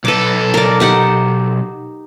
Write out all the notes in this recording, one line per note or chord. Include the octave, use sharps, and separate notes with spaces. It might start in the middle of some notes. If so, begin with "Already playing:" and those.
B1 A4 B4 D6
A#4 D5
D#4 G4 F#5